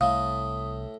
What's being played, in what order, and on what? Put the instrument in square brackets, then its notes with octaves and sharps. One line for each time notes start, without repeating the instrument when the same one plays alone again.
[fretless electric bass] C2 [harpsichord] A2 A3 [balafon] F5 [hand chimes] D#6